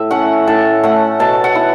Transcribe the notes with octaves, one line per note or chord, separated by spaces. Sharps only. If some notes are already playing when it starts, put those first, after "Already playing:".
Already playing: A2 E5
A3 C#4 F#5
A2 A5
A3 C#4 F#5
B2 A5
F#5
B3 E4